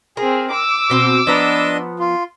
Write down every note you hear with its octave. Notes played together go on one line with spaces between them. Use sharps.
C4 G#4 A#4
D6 E6
B2 C4 C5
F3 B3 D4 D#5 A#5
F4